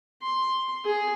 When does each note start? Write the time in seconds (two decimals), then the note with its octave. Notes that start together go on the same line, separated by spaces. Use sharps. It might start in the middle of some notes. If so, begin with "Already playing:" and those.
0.22 C6
0.85 G#4